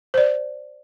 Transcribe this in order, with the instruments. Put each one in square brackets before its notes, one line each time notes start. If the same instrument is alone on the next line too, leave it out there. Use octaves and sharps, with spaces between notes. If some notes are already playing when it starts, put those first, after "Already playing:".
[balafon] C5 D5